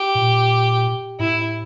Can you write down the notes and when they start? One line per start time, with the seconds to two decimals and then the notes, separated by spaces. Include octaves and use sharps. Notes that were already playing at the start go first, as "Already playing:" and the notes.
Already playing: G4
0.15 A#2
1.19 A2 E4